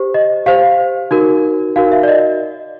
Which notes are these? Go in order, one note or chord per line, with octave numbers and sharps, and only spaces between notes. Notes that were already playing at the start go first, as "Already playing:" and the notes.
Already playing: G4 C5
D#5
G4 C5 F5
D#4 F#4 A#4
D#4 F#4 A#4 F5
E5
D5
D#5